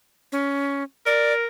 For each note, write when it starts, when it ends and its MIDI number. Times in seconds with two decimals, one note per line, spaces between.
0.32 0.83 61
1.06 1.47 70
1.06 1.34 74